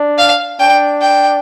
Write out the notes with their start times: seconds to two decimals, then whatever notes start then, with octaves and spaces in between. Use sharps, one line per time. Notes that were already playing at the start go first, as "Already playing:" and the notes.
Already playing: D4
0.18 F5
0.59 D4 G5
1.01 G5